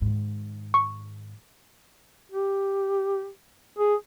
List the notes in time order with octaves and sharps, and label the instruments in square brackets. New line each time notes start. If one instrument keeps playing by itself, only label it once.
[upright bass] G#2 D#3
[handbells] C#6
[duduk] G4
G#4